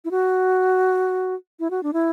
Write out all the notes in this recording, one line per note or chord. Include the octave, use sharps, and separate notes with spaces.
E4
F#4
E4
F#4
D4
E4